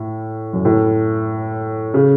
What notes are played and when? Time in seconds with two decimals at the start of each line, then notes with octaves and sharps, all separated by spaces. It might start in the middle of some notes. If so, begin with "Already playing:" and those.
Already playing: A2
0.53 F#2
0.65 A2
1.94 C#3